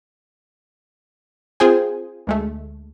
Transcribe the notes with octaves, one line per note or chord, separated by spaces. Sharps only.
C4 F4 G#4 C5 G5 G#5
D2 G#3 A3